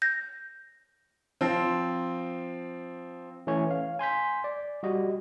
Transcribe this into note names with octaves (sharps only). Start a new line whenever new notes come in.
G6 A#6
F3 C4
E3 A3 C#4 C#5
F5
G#5 C6 G6 B6
D5
G3 F#4 D#5